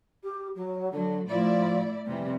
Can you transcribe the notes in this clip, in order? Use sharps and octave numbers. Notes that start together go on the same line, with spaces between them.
G4
F#3
D3 F#3
A2 F3 E4 D5
F2 C3 E3 G3